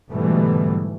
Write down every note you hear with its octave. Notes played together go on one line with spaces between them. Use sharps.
G#2 B2 D3 E3 G3 A3